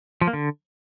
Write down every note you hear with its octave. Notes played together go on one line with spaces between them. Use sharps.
F3
A#3
D3